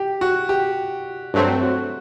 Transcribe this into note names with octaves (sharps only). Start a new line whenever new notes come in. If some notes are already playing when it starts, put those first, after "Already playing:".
Already playing: G4
F#4
G4
G2 F#3 A3 C4 F#4
F#4